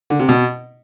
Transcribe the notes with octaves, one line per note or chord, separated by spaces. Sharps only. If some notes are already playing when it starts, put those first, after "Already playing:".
D3
C3
B2